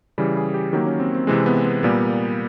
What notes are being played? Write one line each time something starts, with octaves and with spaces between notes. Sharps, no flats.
C#3 E3 G3 G#4
G#4
G4
D#3 F#3 A#3 G4
C#4
C4
C4
C3 E3 G#3 C4
B3
B3
A#2 G3 A#3 B3